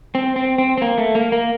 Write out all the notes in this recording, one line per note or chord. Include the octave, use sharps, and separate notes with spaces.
C4
C4
C4
C4
A#3
A3
A#3
A#3